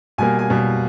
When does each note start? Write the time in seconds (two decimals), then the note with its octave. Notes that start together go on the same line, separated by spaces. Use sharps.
0.18 B2 G3 A#3 G#5
0.39 G#5
0.50 B2 G3 A#3